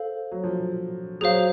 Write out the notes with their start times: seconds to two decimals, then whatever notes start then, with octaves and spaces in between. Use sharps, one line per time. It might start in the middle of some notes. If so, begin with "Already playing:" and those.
Already playing: A4 C5 F5
0.32 F#3
0.44 F3
1.21 F#3 G#4 C5 F5